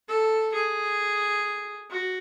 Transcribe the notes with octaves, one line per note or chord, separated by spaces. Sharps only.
A4
G#4
F#4